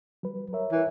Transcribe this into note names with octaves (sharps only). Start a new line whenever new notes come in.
F#3 G3 B4
A#4 C#5 E5
E3